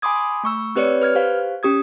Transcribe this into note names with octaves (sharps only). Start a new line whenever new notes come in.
G#5 B5 C6 D6 D#6 G#6
A3 C#6 E6
C4 G4 B4 C#5 D5 C#7
B4 F6 G#6
G4 C5 F5
C#4 G4 D#6 G#6